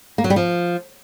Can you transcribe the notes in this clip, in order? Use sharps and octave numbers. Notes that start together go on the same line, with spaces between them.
A#3
F#3
G3
F3